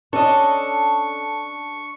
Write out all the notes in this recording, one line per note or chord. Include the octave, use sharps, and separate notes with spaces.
C#4 D4 A4 D#5 C#6